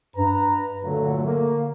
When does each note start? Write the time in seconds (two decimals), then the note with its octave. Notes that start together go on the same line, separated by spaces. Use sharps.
0.16 G2 B4 A#5
0.84 A#2 D3 F#3 A3
1.26 A#3